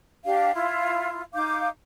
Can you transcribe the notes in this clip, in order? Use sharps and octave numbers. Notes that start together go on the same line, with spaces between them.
D4 G4 F5
E4 F4
D#4 F5 D6 G6